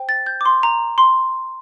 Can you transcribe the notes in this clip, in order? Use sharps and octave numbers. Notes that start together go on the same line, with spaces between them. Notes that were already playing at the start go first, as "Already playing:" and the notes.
Already playing: C5 G5
A6
G6
D6
C6
A#5
C6